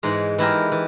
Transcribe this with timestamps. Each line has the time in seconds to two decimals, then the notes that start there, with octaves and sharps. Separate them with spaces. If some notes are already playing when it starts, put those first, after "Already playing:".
0.03 G#2 E3 G#3
0.38 E3 G#3 E4 G4 A#4
0.72 E3